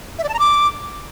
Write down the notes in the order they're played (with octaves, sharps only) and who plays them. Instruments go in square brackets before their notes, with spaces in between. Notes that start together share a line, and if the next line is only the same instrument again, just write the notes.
[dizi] E5
D5
A5
A#5
D6